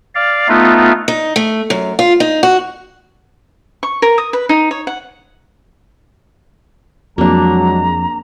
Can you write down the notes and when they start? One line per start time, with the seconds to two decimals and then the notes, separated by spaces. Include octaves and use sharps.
0.15 D5 F5
0.49 A3 B3 D#4 F4
1.08 D#4
1.36 A3
1.70 F#2
1.99 F4
2.20 D#4
2.43 F#4
3.83 C#6
4.02 A#4
4.18 D#6
4.33 B4
4.49 D#4
4.71 C#5
4.87 F#5
7.18 F2 F#3 G#3 A#3 D4 A#5